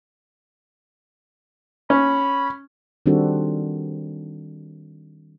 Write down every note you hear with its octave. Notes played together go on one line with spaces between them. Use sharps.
C#4 B5
D#3 G3 C4 D4 F#4 A4